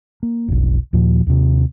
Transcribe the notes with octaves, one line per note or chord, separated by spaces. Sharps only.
A#3
F1 B1
D#2 A#2 F3
D#2 C3